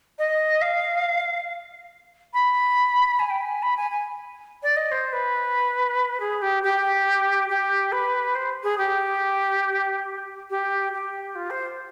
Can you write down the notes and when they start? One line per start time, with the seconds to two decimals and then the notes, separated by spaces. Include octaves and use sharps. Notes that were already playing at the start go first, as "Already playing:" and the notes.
0.18 D#5
0.61 F5
2.33 B5
3.19 G#5
3.30 G5
3.41 G#5
3.62 B5
3.77 G#5
3.91 G#5
4.62 D5
4.76 D#5
4.91 C5
5.13 B4
6.20 G#4
6.42 G4
6.63 G4
7.49 G4
7.92 B4
8.35 C5
8.63 G#4
8.78 G4
10.50 G4
10.93 G4
11.35 F4
11.50 C5